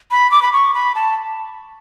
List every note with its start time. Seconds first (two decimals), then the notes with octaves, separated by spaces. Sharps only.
0.11 B5
0.31 D6
0.42 B5
0.53 C#6
0.74 B5
0.95 A5